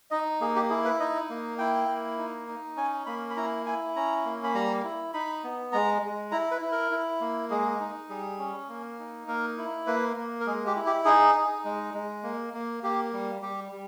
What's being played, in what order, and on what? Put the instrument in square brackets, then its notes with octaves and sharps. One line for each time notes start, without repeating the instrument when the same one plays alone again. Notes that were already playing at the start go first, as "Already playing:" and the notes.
[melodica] D#4 D#5
A#3 G#4
G4
E4 G#4
B4
D#4 D#5
A#3
E4 G5
A#3
D#4
D#4
C#4 G#5
A#3 B5
B5
E4 A#5
E4 G#5
C#4 A#5
A#3
B5
G3 A#5
E4
D#4 B5
B3
G#3 A#5
G#3
E4 A#5
B4
E4
A#4
E4
A#3
G#3 G#4
D#4
G3 G#4
C#4
A#3
D#4
A#3 A#4
E4
A#3 B4
A#3
A#4
G#3 G#4
G4
E4
G4
D#4 G#4
D#4
G#3
G#3
A#3
A#3
A#3 G4
G3
G3 G4
G3